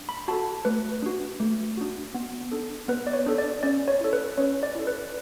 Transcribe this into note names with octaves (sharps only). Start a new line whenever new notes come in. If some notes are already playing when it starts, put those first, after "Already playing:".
Already playing: D4
B5
F#4 A4 A5
A3 B4
D4 F#4
A3
D4 F#4
B3
D4 A4
B3 B4
D5
C#5
D4 A4
D5
C#4 D5
C#5
E4 A4
B4
C#4 C#5
D5
E4 A4
B4